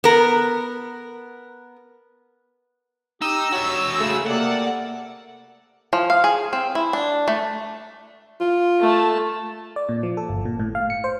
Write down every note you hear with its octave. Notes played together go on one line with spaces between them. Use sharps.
B3 A#4
D#4 G4 E6
F#4 C#5 E5
C#3 A3 G#4
C3 A#3 A4 D5 F#5
F3
F5
G#4
C4
E4
D4
A3
F4
A3 A5
D5
A#2
F3
A4
G1
A#2
A2
F5
C#7
C5